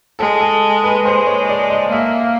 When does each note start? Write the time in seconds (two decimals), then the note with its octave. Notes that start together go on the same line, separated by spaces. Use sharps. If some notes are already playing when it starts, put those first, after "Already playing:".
0.19 G#3 A4
0.40 A4
0.84 B4
1.05 G#3 C5
1.27 C#5
1.49 D5
1.70 D#5
1.92 A#3 E5
2.21 F5